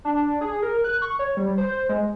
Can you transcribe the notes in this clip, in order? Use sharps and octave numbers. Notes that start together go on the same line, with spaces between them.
D4
G#4
A#4
F#6
C#6
C#5
G3
C5
G#3